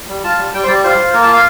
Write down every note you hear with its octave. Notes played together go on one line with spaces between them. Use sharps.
G3
F4 A5
G3
G3 G5
C5
G3 D5
F4 C5
F4
A#3 A#4
A5
F4
F5